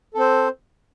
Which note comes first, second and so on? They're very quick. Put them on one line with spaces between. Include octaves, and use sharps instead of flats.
A4 C4 C5